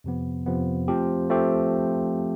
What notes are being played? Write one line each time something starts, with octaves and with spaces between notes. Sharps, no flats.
F2 C3 F3 B3
F2 C3 F3 B3
F3 A3 C4 G4
F3 A3 C4 G4